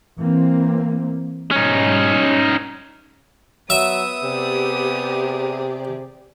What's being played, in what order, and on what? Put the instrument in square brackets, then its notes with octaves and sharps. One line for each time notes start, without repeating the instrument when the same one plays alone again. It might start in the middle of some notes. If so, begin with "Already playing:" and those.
[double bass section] E3 A#3 C4
[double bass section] G#2 B2 G3 [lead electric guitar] C#4 D#4
[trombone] F#3 [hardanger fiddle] B3 D#6 [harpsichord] E5
[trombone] C3 [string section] G4 G#4 D5